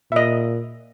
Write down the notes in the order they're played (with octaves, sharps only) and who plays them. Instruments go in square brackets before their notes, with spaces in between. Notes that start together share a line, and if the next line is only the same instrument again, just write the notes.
[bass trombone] A#2 [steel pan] D#5 E5